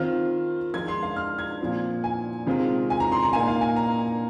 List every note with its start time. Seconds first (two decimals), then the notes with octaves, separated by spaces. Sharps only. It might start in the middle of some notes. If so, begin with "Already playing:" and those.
Already playing: D#3 C4 F4 F6
0.74 F3 G#3 F4 G#6
0.88 C6
1.03 F5
1.16 F6
1.38 G#6
1.60 A#2 F3 C4
2.04 G#5
2.47 C3 D#3 G#3 C4 F4
2.90 G#5
3.00 A#5
3.12 C6
3.23 A#5
3.33 A#2 A#3 D#4 G#5
3.48 F5
3.61 G#5
3.76 A#5